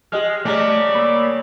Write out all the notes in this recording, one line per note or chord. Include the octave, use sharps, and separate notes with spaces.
G#3 G4 D#5 F6
C#3 G3 A3 D5 A#5
A#3 B5 E6